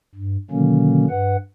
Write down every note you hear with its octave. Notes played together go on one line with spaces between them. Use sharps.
G2
B2 D3 D#3 F#3 A#3 C#4
G2 B4 F#5